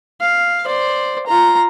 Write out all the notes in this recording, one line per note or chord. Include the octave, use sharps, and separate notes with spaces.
F5
C5 D5
F4 A#5